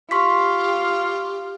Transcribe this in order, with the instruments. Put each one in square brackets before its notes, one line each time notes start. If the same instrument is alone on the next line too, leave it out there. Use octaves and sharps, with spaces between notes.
[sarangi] F4 [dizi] G4 [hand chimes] C6 C#6 B6